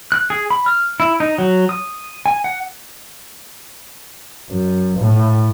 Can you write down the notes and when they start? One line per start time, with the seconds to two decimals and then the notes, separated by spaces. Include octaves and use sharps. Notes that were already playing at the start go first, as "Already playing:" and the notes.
0.12 F#6
0.30 G#4
0.50 B5
0.66 F6
1.00 E4
1.20 D#4
1.38 F#3
1.69 D#6
2.26 G#5
2.44 F#5
4.50 F#2
4.99 A2